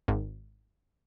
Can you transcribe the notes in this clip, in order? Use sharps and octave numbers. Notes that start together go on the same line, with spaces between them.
G#1